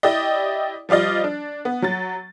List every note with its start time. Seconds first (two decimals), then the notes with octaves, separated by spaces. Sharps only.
0.03 E4 G4 D5 D#5
0.89 F3 G3 F4 D5 D#5
1.24 D4
1.65 B3
1.82 F#3 A6